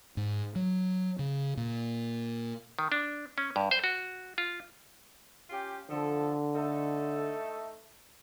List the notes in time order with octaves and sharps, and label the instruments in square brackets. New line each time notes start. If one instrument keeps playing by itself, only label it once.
[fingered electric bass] G#2
F#3
C#3
A#2
[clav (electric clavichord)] D#3
D4
C#4
G2
C5
F#4
F4
[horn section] C#4 F4 G4
[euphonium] D3 [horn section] F3 A4
[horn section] A3 D#4 A4